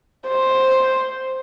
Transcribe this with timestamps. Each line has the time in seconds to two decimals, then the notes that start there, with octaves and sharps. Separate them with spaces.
0.28 C5